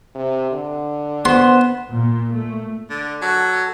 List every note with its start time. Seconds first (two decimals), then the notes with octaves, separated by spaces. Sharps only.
0.15 C3
0.51 D3
1.25 B3 C5 C6
1.92 A#2
2.32 A3
2.90 D3
3.22 F#3 A4